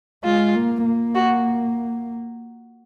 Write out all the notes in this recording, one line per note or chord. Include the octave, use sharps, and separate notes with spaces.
G#3 F4
A#3
A#3
F#4